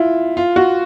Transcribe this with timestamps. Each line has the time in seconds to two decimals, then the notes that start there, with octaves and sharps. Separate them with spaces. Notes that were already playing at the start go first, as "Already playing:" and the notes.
Already playing: E4 F4
0.37 F4
0.56 F#4